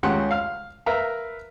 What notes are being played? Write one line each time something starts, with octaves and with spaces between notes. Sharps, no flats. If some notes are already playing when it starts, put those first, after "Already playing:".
C#2 C#3 G4 F#5 C6
F5 F6
A#4 B4 E5 F5 A#5